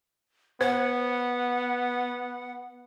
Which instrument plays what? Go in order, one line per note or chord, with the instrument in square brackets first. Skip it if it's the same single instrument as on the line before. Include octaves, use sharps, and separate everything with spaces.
[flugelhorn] B3 [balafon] C5 [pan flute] F#5